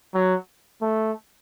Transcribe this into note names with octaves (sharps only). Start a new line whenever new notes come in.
F#3
A3